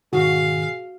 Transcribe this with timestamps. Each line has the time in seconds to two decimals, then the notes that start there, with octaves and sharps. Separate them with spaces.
0.13 G#2 B2 D#3 F#4 G#4 F5